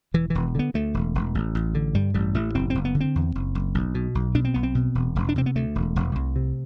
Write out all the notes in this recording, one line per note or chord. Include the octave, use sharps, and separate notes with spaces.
E1 E3
E1 E3
D3 B3
D2 A3
E1
E1
A1
A1
D3
G2 G3
A1 G3
A1 A3
F#1 C4
F#1 C4
B3
D3
C4
E2
F#1
F#1
B1
B2
B1
B2 D4
C4
B1 B3
C4
B2
E1
E1
D4
C3 C4
B3
D2 A3
E1
E1
C2
C3